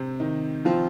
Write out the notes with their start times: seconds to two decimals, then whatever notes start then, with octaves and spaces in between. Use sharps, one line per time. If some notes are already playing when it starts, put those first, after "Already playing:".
Already playing: C3 C4
0.20 D#3 D#4
0.65 F3 C4 F4